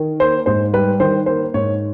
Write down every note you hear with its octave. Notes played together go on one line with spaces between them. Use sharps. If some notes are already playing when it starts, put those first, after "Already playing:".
Already playing: D#3
A#3 C5
G#2 C5
G3 B4
D#3 C5
A#3 C5
G#2 C#5